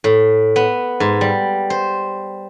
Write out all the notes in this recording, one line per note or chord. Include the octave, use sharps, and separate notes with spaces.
A2
B3
G#2
G3
C5